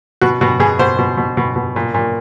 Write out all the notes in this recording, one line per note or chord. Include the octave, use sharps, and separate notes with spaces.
B2 F#4
B2 F#4
B2 G#4
B2 C5
B2
B2
B2
B2
A#2
A#2